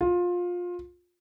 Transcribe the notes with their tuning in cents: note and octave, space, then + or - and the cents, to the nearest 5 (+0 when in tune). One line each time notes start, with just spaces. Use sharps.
F4 +20